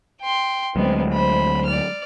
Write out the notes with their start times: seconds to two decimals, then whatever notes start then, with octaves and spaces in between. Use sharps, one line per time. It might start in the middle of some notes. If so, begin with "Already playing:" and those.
0.20 G5 C6
0.76 D2 F#3 G#3 B3 C4
1.13 C5 B5
1.66 D5 F6